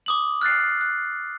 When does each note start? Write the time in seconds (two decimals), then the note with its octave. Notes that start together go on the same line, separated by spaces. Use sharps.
0.06 D6 D#6 F#7
0.41 F6 F#6 A6 C7
0.81 F#6